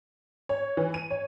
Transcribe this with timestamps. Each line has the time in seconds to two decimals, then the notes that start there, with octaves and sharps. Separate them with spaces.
0.49 C#5
0.77 E3
0.94 D#7
1.11 C#5